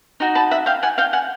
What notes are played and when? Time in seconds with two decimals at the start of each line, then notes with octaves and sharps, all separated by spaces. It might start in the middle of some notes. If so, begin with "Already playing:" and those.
0.20 D#4 F#4
0.35 A5 B5
0.51 E5 F#5
0.66 F5 G5
0.83 F#5 G#5
0.98 F5 G5
1.13 F#5 G#5